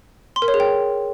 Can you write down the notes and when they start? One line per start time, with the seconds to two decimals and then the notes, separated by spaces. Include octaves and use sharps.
0.36 C6
0.42 A#4
0.48 C#5
0.54 G#4
0.60 G5